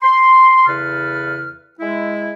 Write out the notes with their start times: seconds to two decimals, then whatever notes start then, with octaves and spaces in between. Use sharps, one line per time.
0.03 C6
0.67 E2 C#3 E4 A4 B4 F6
1.80 G#3 E4